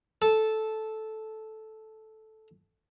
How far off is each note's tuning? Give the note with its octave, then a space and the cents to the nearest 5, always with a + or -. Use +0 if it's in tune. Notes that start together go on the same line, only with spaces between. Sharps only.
A4 -10